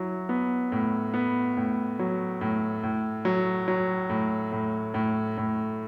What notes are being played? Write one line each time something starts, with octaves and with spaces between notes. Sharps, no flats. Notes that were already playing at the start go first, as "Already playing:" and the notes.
Already playing: F#3 E4
B3
A2
B3
A2
F#3
A2
A2
F#3
F#3
A2
A2
A2
A2